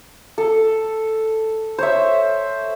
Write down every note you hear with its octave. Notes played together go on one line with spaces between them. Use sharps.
A4
C5 C#5 E5